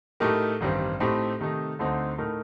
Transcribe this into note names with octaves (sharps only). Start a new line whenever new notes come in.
A2 A3 D#4 G4 A#4
A1 G2 D#3 G3 C4
A2 A3 C4 D#4 G4
C3 D#3 A3 D#4
D2 D3 A3 C4 D#4
A2 A3 D#4 A#4